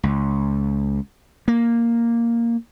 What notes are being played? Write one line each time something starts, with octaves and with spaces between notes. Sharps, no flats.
C#2
A#3